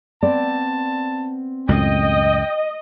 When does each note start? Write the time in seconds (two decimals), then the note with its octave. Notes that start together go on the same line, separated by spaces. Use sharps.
0.23 B3 C4 D5 A5
1.69 C#2 F#2 A2 D#5 G5